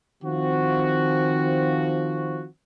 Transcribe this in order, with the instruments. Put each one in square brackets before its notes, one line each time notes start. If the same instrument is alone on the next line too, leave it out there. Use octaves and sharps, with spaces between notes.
[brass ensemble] D#3 F3 C4 F#4